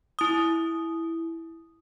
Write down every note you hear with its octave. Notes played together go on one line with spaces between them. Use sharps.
E4 D#6